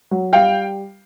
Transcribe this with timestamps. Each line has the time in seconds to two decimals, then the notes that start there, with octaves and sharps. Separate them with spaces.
0.11 F#3
0.33 G3 F5 G5